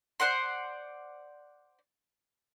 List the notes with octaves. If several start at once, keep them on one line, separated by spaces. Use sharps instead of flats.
C5 D5 F#5 C6